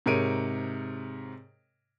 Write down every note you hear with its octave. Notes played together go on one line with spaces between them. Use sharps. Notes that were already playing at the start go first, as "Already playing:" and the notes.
G#2 C3 A#4 C#5 D7 D#7